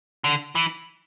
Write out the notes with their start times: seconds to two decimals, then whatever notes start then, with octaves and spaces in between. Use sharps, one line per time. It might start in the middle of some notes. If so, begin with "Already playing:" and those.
0.24 D3
0.55 E3